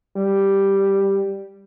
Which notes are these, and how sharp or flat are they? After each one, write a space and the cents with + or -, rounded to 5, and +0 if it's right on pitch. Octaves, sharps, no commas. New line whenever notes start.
G3 +0